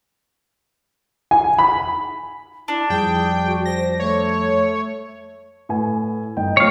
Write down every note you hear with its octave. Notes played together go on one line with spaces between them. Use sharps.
G#5
B5
D4 E4
F2 F3 G3 G#4 G5
F#4
C5 A#6
A3 C#5
A2 B4 G#5
G1 D#4 G5
F3 A3 C#5 F5